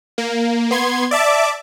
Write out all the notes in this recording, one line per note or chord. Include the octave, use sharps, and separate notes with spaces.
A#3
B3 C6 G#6
D5 E5 A5 D6